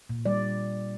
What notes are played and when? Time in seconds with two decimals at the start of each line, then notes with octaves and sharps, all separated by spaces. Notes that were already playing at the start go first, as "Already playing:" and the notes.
0.10 A#2
0.25 G3 D5